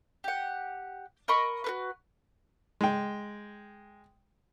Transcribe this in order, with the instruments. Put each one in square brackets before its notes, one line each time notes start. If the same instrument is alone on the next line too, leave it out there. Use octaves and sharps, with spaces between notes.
[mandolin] G4 F#5
A#4 D#5 B5 C#6
F#4 A#4 B4
[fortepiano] G#3 G5